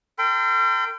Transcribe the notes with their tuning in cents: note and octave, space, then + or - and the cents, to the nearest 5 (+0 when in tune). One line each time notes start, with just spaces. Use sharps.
A#4 -45 G5 +0 C6 -45